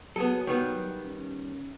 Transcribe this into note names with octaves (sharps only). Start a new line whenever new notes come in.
F#3 B3 G#4 A4
D#3 G3 B3
C#4